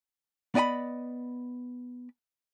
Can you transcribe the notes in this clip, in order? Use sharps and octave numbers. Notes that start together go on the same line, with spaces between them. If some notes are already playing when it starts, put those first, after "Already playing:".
B3 D5 D#5 G5 B5